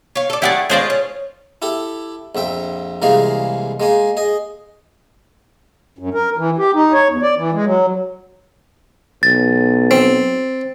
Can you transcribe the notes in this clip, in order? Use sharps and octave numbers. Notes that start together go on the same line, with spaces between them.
C#5 F5
A4 D5
A3 E4 G4 G#4 D5 F#5
A2 G#3 F4 G#4 C5 D5
C#4
E4 G4 A4
A#1 F2 E5 G5
C2 E3 G#3 A#3 G#4 F5
G#3 A#3 G#5
G#4 D#5
F#2
A#4
E3
G4
D#4
C#5
E2
D5
E3
G#3
F#3
B1 A6
C4